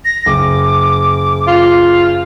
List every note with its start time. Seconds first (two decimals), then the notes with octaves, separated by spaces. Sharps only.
0.05 A#6
0.26 F#1 D6
1.47 F4